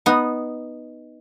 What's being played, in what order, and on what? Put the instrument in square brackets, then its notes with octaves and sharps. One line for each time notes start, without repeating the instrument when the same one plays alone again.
[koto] B3 D#4